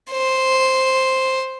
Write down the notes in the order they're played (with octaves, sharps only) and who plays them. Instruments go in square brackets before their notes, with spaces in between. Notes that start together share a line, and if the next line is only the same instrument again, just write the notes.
[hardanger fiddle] C5